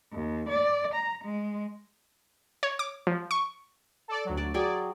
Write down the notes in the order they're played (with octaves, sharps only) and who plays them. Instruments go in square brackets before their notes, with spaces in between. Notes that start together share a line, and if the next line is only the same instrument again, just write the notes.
[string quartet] D#2
D5
A#5
G#3
[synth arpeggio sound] C#5
D6
F3
C#6
[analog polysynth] A4 D5
D2 F#3
[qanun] D5 A5
[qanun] F#3 G#4 G5 [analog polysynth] D5